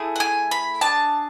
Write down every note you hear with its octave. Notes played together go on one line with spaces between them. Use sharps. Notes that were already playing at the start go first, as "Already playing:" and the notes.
Already playing: A3 E4 G#4
F#5
G#5
B5
D4 G#4 A5